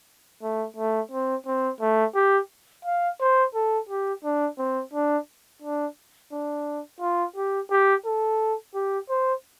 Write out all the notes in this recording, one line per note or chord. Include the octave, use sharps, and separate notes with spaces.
A3
A3
C4
C4
A3
G4
F5
C5
A4
G4
D4
C4
D4
D4
D4
F4
G4
G4
A4
G4
C5